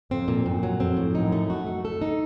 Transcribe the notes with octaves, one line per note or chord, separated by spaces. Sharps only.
F2 C4
A#2
F#2 A#2
F#3
F2 C4
A2
F#2 D#4
A3
F#4
A3
A4
D#4